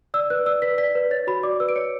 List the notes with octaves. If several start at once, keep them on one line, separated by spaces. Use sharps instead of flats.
D5 E6
B4 F#6
D5 E6
B4 B6
D5 B6
B4
C#5 A6
F#4 B5
D5 D6
B4 E6
D7
C#5 C#7